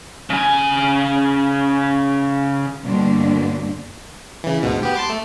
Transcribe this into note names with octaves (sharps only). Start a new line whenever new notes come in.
C#3 G#5
G2 B2 D3 A#3 C4 D4
C#3 E3
D2 G#2 B2
B3 G4
A5 C6 D6
A3